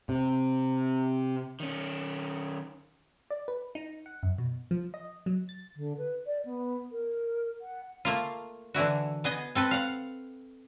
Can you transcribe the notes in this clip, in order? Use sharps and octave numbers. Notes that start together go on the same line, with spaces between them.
C3
D#3 C#4
D5
B4
D#4
F#5
F#2
B2
F3
D#5
F#3
A6
D3
B4
D5
B3
A#4
F#5
A3 A#3 F4
D3 E3 E4 F#4
B3 G#4 D#5
C4 A4 B4
F5 F#5